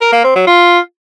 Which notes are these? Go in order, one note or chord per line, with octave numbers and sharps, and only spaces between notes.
A#4
A#3
C4
F#3
F4